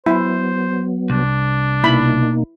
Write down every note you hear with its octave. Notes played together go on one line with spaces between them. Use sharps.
F#3 B3 E4 C5
C2 D4
B2 A#3 D#4 E4 B5